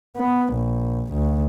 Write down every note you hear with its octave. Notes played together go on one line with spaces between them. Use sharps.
B3
A#1
D2